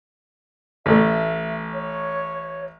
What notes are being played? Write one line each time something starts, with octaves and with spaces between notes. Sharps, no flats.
A1 A3 E5
C#5